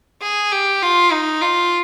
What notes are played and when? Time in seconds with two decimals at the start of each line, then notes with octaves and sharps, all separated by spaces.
0.23 G#4
0.52 G4
0.82 F4
1.12 D#4
1.41 F4